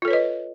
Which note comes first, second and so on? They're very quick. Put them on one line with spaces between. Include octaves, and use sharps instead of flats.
F4 A4 C#5 B4 D#5